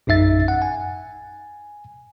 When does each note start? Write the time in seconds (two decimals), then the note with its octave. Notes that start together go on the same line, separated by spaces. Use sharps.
0.07 A#1 F#2 D#4 E5 A6
0.48 F#5
0.62 G#5